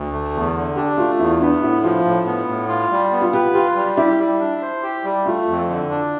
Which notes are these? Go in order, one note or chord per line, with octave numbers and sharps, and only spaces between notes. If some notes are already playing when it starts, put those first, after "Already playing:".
Already playing: D2
A3
E2
D3
D4 G4
A3 F4
E2 E4
B3 D4
A2 E4
F3 F4
A2
B3
A2
F4
G3
B3
F4
G4 B4
F4 G4
G3
E4 G4
G3
D4
C5
G4
G3
A3 F4
F2
D3
D4